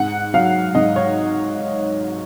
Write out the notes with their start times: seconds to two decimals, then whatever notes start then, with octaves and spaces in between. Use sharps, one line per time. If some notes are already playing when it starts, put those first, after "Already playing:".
Already playing: G#2 F#5
0.34 F#3 F5
0.75 G#2 D#5
0.96 C#5